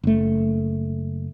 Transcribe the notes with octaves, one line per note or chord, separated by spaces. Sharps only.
F#1 A3